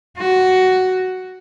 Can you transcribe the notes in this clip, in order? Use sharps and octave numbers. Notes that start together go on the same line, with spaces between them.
F#4